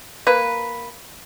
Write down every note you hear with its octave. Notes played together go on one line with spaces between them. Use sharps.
A#3 B4